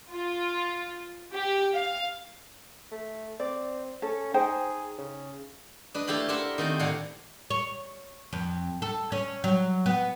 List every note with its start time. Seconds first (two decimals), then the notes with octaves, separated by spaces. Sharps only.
0.13 F4
1.34 G4
1.74 F5
2.91 A3
3.40 C4 D5
4.02 C#4 A4
4.34 D#4 G#4 C5 G5
4.98 C#3
5.94 D4 B4 D#5
6.07 A3 E4 G4 F5 B5
6.29 G4 A#4 C5 E5 F#5
6.58 D#3 A3 C4
6.79 A2 D3 D4 F5 F#5 A#5
7.50 C#5
8.33 F2
8.82 A4
9.12 C#4
9.44 F#3
9.86 B3